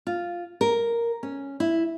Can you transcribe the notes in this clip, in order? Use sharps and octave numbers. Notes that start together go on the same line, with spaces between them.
F4
A#4
C#4
E4